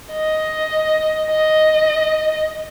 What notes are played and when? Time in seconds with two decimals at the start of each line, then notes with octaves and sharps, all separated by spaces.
0.12 D#5
1.31 D#5